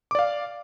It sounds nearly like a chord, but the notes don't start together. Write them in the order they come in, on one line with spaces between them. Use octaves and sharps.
D6 D5 F5